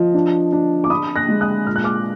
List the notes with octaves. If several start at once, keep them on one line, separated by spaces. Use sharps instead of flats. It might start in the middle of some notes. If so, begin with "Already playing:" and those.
Already playing: F3 D#5
D4
D4
D6
D4 B5 D#6
F#6 A#6
G#3
D#6 F#6
A#2 F6
F#6
D6 F6